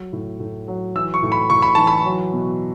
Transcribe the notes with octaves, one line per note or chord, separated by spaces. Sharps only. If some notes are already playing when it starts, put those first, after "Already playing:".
Already playing: F#3
A2
A2
F#3
E3 E6
C#6
A2
B5
A2 C#6
B5
E3 A5
B5
F#3
B2